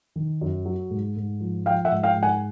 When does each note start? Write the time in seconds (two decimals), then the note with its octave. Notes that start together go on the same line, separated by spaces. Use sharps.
0.16 D#3
0.41 F#2
0.66 F#3
0.90 G#2
1.16 G#2
1.40 F3
1.66 F3 F5 G5
1.85 E5 F#5
1.91 G#2
2.04 F5 G5
2.16 G#2
2.23 F#5 G#5